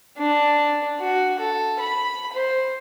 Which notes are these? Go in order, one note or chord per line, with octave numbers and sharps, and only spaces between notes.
D4
F#4
A4
B5
C5